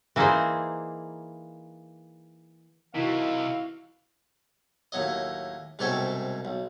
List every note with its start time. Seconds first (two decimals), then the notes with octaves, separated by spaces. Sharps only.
0.16 E3 A#3 D#4 G#4 C5
2.94 C3 D#3 E3 E4 F#4 F5
4.92 D#2 A2 F#3 D#5
5.79 C2 G#2 B2 G4 A4 C#5
6.45 B1